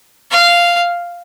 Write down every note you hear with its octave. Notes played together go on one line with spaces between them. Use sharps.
F5